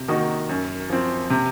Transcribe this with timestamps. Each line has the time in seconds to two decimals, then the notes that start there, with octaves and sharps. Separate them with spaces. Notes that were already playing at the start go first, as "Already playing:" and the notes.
Already playing: C3
0.08 D#3 A#3 D#4 F#4
0.49 F#2
0.90 F3 C4
1.30 C3